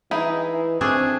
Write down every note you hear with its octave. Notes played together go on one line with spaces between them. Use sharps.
E3 D#4 E4 G#4
A3 C4 D4 G#4